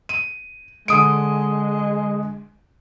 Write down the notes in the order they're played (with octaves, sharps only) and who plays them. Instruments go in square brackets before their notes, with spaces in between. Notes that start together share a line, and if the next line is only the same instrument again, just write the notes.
[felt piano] D#7
[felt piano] D3 D#6 D7 [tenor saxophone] G#3